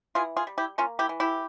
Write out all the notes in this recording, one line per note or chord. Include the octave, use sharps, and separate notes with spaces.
E3 F4 G#4
F4 G#4
G3
E4 G4
A#3 C#4 F4
E4 G4
E3
E4 G4